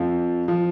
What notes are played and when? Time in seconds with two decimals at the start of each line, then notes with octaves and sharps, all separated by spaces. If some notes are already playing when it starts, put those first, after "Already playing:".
Already playing: F2 F3
0.48 F3